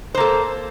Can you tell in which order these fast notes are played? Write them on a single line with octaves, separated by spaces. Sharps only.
C5 A#3 A4